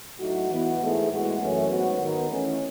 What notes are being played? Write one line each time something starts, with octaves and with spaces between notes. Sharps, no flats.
A2 F#3 A3 D#4 F#4
E3 B3 F#4
G#2 E3 A3 E4 G#4
A2 E3 G#3 B3 F#4
F#2 E3 A3 C#4
G#2 F#3 B3 F#4
D#3 F#3 B3 D#4
E3 A3 C#4